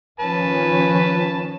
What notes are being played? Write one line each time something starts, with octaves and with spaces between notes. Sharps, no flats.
D#3 F3 C#4 B4 A5